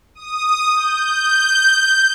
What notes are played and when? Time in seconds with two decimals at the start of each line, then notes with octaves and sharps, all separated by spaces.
0.15 D#6
0.76 G6